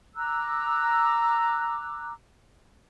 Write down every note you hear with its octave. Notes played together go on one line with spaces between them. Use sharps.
A#5 D6 E6 F#6